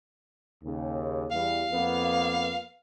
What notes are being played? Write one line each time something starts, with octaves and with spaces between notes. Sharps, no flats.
D#2 C#3
E2 G3 F5
F2 A#3 B3